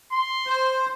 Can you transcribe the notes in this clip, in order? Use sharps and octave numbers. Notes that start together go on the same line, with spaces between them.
C6
C5